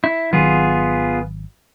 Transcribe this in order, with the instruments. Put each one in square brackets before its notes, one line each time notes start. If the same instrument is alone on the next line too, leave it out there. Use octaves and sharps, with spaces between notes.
[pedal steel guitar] E4
[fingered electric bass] G#1 D#3 F#3 [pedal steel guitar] B3 F4 G#4